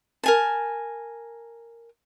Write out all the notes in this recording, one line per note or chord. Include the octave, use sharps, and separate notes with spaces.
A#4 G#5 A5